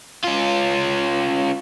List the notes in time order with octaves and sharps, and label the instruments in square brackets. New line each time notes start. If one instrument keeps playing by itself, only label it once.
[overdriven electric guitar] C#4 F4